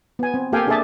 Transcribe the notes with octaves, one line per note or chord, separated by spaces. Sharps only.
B3 G#5
C4
A#3 G4 A4 F5 G5 G#5
D4 G#4 A4 D5 E5 A5